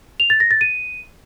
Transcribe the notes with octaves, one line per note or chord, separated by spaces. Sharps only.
F7
A6
A#6
A6
D#7